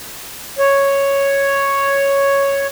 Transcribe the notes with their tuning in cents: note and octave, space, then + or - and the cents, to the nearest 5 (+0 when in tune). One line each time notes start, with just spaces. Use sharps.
C#5 +0